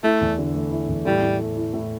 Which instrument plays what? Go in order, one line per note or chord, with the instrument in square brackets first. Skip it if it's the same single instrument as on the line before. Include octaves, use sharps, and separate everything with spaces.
[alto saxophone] A3 [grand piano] E4
[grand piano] E2
D3
A3
E4
E2
[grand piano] A2 [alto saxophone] G3
[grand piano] A2
A3
E4
A2